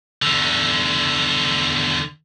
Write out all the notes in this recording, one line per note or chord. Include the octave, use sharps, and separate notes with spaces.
E2 D3